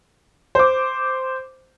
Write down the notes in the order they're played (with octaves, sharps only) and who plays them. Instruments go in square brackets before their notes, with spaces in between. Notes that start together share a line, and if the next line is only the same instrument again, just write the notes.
[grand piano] C5 D6